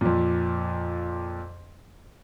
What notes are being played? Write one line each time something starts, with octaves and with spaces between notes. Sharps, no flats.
F2 A#2